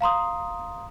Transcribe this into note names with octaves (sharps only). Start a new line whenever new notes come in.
F5 A#5 C6 D#6